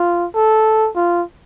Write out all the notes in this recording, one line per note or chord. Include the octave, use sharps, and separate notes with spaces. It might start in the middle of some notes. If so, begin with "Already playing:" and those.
Already playing: F4
A4
F4